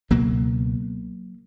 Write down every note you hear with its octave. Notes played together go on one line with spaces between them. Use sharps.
C#2 B2 F#3 A#3